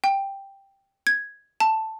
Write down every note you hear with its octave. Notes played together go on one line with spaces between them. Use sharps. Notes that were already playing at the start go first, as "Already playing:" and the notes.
G5
G#6
A5